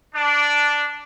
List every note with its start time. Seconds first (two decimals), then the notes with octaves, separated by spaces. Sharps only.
0.15 D4